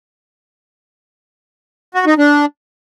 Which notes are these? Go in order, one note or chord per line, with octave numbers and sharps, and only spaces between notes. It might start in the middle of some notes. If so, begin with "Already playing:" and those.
F#4
D#4
D4